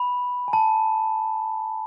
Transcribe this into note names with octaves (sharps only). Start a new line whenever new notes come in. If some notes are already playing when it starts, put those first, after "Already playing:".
Already playing: B5
G#5
A5